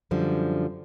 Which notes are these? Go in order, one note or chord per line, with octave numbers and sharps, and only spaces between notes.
F#2 D3 F3 G3